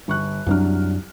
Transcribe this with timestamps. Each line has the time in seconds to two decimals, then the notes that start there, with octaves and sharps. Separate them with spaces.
0.08 G1 C#6 F#6
0.47 C2 F#2 F#3 C4 D4 F6